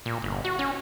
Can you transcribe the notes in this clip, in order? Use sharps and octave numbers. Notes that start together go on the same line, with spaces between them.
A#2
G1
F#4
C#4